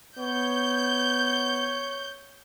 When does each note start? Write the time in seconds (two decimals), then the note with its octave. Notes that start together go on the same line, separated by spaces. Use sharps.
0.18 B3 C#5 G6